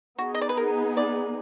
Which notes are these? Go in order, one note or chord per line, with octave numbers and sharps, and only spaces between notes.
B3 D#4 F#4 G#4
D#5
D5
B4
A#4
D5